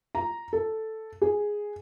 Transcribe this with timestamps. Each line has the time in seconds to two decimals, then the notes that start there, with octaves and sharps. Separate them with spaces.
0.15 A#5
0.53 A4
1.21 G#4